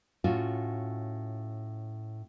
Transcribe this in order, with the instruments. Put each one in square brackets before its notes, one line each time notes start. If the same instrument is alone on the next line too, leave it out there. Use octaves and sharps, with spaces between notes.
[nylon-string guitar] A2 C#4 F4 F#4